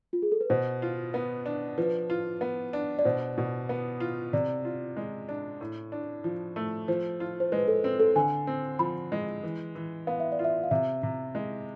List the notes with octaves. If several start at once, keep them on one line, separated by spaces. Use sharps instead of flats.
F4
G#4
A4
B4
B2 C5
F4
B3
D4
F3 B4
F4
B3
D4
D5
B2 C5
B2
B3
F4
C3 D5
F4
G#3
D4
A2
D4
F3
A3
F3 C5
F4
C5
G#3 B4
A4
C4
A4
D3 G#5
C4
F3 B5
G#3
E3
E3
B3 F5
E5
D5
F4
E5
F5
C3 E5
C3
G#3